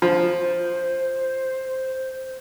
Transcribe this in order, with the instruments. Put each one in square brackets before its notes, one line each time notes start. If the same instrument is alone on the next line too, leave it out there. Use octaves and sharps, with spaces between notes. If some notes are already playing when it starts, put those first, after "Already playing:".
[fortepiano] F3 [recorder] C5